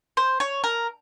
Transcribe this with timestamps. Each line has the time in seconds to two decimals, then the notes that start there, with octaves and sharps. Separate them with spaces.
0.17 C5
0.40 C#5
0.64 A#4